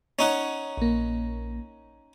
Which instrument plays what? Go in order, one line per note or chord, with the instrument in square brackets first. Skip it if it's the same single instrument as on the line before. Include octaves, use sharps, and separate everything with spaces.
[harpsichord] C#4 D#4 F#5
[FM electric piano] A#1 A#3